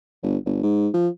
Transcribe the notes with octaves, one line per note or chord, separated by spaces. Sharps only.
G1
G1
G#2
F3